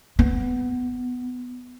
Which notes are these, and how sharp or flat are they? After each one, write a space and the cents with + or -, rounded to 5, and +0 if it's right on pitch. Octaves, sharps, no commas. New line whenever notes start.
B3 +10